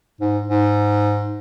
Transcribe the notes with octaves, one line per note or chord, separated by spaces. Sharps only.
G#2
G#2